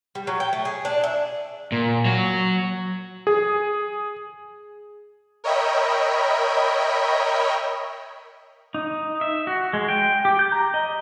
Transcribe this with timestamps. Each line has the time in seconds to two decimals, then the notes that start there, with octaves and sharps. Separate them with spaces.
0.15 G3
0.27 F#3
0.40 G5
0.53 A3
0.65 G#4
0.85 D4
1.04 E5
1.72 A#2
2.05 F#3
3.27 G#4
5.44 A#4 C#5 D#5 E5 G5 B5
8.74 D#4
9.21 E5
9.47 F#4
9.73 G#3
9.88 G5
10.25 G4
10.39 G6
10.52 A#5
10.74 D#5